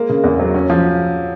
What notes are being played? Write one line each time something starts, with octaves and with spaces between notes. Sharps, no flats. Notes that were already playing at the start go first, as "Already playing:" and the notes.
Already playing: G#3 A#3
C#3
E2
F#3
C#4
F3